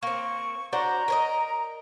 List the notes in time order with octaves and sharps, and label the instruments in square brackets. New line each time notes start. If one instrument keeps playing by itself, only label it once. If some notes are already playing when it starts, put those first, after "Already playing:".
[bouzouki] A#3 C4 [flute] C#6
[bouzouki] D4 F#4 C5 [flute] A#5
[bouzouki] A#4 C#5 D#5